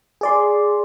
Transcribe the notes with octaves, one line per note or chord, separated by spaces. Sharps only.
G#4 D5 C6